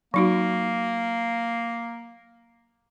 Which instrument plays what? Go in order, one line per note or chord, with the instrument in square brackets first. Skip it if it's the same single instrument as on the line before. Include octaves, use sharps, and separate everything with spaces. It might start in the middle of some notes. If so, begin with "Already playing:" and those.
[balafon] F#3 D#4 F#4 [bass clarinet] A#3